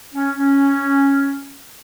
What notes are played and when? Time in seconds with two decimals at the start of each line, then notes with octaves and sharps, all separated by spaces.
0.14 C#4
0.38 C#4